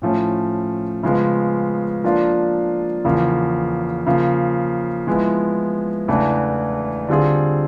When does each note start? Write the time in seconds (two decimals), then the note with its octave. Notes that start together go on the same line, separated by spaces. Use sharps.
0.02 A2 F3 A3 C#4
1.03 C#3 F3 G#3 B3
2.04 F3 A#3 D4 F4
3.04 E2 C#3 F3 A#3
4.06 C#3 F3 A#3
5.07 F3 G#3 B3 E4
6.08 E2 C#3 E3 A3 D4
7.09 D3 G3 C4 F4 G#4